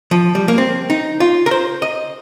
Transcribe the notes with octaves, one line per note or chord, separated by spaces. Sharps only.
F3
G3
A#3
C4
D#4
F4
A#4
C5
D#5